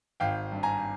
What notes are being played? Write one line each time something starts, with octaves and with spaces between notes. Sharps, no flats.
G#1 F5 G5
G2
G#5 A#5